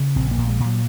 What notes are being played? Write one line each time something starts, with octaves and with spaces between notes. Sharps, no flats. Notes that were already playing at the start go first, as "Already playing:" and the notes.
Already playing: C#3
A#1 C4
A#3
A#2
G#3
A#2
F#3